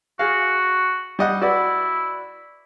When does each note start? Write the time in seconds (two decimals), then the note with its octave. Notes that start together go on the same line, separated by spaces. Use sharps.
0.19 F#4 G#4 F5
1.19 G3 D#5 F#5
1.42 E4 F#4 B4 D5